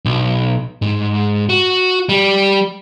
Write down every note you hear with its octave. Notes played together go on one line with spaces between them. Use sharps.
B1
G#2
F#4
G3